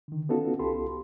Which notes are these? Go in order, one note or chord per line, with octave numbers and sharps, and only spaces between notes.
D3 D#3
B3 C#4 D#4 F4 F#4 A4
C2 F4 G4 A4 B5 C6